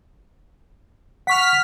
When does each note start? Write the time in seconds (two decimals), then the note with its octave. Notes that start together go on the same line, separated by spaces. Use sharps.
1.27 F#5 C#6 F6 B6